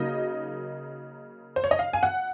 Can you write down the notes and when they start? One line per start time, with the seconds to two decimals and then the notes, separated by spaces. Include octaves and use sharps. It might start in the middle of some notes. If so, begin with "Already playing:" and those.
Already playing: C#3 F#3 A#3 D#4 D#5
1.56 C5
1.64 C#5
1.71 D#5
1.79 F5
1.93 G#5
2.03 F#5